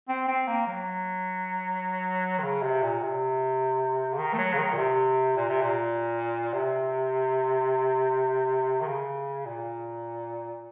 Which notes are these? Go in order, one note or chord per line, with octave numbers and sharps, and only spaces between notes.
C4
C4
A#3
F#3
D#3
C#3
C3
A#2
C3
C#3
D#3
A3
F#3
C#3
D#3
A#2
C3
A#2
C3
A#2
C3
D#3
C#3
A#2